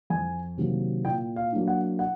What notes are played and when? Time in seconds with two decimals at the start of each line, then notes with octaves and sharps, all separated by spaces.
0.10 F2 G#5
0.57 C3 D#3 F#3 A#3
1.04 A#2 G5
1.36 F5
1.52 F#3 A#3 D4
1.68 F#5
1.99 F#5